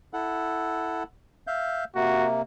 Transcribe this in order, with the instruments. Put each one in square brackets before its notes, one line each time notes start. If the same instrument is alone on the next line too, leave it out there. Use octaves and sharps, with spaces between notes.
[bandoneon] E4 A4 F#5
E5 F5 G6
[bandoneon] C3 A#3 [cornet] F#4